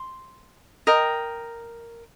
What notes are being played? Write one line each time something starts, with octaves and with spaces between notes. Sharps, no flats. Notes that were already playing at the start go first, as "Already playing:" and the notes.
Already playing: C6
A#4 D#5 G5